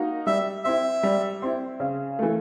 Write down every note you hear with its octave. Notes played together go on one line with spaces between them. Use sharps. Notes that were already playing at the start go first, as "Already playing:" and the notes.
Already playing: A#3 D#4 F#4
G3 E5
C4 E4 E5
G3
C4 E4
C#3
E3 A3